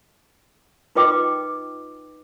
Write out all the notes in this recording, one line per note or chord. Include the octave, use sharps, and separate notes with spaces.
D#4 F4 B4 D#5 G5 D6